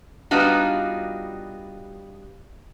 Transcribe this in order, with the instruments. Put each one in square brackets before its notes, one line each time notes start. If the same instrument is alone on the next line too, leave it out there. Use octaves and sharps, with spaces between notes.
[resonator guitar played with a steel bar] G3 B3 D4 D#4 F4 F#4